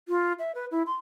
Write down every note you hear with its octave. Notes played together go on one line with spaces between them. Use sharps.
F4
E5
B4
E4
C6